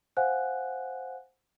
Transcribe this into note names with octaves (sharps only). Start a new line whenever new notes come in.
C5 F5 F#5 G#5 F#6